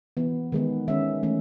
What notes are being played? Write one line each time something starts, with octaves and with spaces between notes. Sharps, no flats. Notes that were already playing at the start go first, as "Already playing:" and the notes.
E3 B3
D#3 G#3 B3
D#3 G#3 C#4 E5
E3 A3 C#4